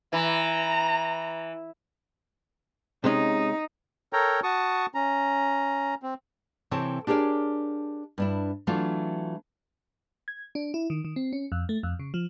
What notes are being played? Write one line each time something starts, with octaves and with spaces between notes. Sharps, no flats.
E3 A#5
C3 G#3 C#4 D#4
A4 A#4 C#5 G5 A#5
F#4 A5 C#6 D#6
C#4 A#5
C4
C3 E3 C4 A4 C#5 A5
D4 G4 G#4 A#4 C#5 D5
G2 D4 E4
E3 F#3 A3 D4 F4
G#6
D4
E4
D#3
D#3
C4
C#4
F2
A3
F2
C#3
F3